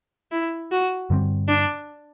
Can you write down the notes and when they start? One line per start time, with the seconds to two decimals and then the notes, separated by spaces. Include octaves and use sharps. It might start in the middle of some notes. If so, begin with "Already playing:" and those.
0.31 E4
0.71 F#4
1.10 G2 D3 G3 C4
1.48 D4